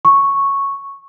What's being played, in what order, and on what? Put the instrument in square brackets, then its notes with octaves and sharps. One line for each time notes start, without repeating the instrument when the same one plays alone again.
[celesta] C#6